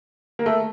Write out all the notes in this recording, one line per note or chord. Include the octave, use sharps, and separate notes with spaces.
A#3
A3